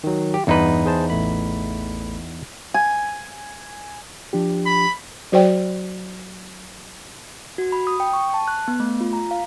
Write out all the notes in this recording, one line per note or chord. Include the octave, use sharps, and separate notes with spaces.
D#3 F#3
G4
E2 G2 D#4 B4
G#4 C5 A5
A1 A3 B5
G#5
F3 D4 G4
B5
F#3 F#4 C5 D5 G5
F#4
B5
D#6
G5
C#6
A5
F#6
B3
A3
F4
A#5
F5